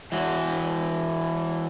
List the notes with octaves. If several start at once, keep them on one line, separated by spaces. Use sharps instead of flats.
E3 F#4